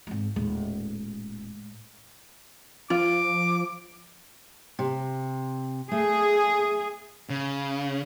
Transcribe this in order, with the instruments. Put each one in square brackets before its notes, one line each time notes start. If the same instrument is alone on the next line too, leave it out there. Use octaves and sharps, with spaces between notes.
[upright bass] G#1 G#3
[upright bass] D#1 [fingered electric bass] A2 G#3
[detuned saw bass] F3 [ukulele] F4 [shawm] D6
[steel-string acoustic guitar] C3
[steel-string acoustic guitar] A3 [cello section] G#4
[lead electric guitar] C#3